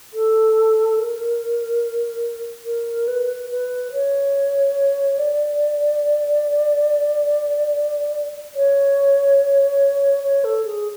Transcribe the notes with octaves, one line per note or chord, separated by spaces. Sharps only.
A4
A#4
A#4
B4
B4
C#5
D5
C#5
C#5
A4
G#4